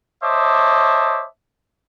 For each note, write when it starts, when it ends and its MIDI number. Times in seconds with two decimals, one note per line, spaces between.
0.23 1.26 72
0.23 1.26 73
0.23 1.26 75
0.23 1.26 76
0.23 1.26 81
0.23 1.26 86